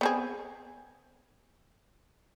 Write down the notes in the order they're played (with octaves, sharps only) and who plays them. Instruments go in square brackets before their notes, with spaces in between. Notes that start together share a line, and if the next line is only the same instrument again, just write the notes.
[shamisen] B3 C4 G#4